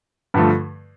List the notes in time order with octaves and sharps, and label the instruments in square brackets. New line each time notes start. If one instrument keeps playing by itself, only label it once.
[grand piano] G2 D3 F3 A3